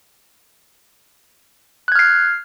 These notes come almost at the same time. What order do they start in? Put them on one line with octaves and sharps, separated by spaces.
F#6 G#6 F6 C7